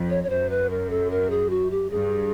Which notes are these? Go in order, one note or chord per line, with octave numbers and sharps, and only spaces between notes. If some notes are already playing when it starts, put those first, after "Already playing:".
Already playing: F2
C#5
C#5
F#2 C5
B4
A#4
A4
A#4
G#4
F#4
G4
G2 G#4